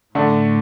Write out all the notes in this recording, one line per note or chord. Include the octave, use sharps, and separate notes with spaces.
A2 D3 A3 D4